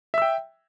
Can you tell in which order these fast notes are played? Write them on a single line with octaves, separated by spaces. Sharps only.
E5 E6 G5